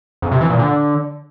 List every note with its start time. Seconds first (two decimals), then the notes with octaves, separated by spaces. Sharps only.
0.22 F2
0.32 C3
0.41 E3
0.50 A#2
0.59 D3